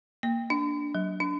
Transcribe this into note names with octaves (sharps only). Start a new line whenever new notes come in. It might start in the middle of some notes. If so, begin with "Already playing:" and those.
A#3
D4
F#3
D4